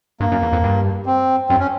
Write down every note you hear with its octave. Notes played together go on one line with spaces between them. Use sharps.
G2 A#3
F#2
E2
F2
G2
C4
F#2 C4
C#4